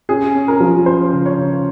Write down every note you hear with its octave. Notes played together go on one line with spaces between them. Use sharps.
C#4 G#4
C#4
A#4
F3
C#4 C5
C#3
C#5
C#3